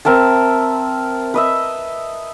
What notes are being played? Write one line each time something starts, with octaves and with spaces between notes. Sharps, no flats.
C4 A#4 E5 A5
B4 D#5 E5